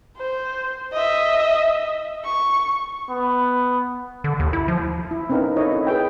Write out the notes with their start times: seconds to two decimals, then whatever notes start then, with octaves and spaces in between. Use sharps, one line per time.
0.17 C5
0.93 D#5 E5
2.25 C#6
3.10 B3
4.24 D3
4.40 D#2
4.53 E4
4.68 F3
5.11 E4
5.29 C4 C#4 D#4 A#4 B4 F5
5.56 D#4 E4 A4 C#5 D#5
5.72 E4
5.87 G#4 B4 G5